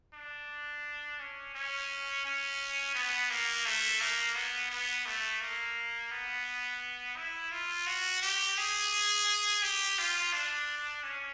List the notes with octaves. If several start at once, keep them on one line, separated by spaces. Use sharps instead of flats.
D4
C#4
C#4
C#4
B3
A#3
A3
A#3
B3
B3
A3
A#3
B3
E4
F4
F#4
G4
G#4
G4
F4
D4
C#4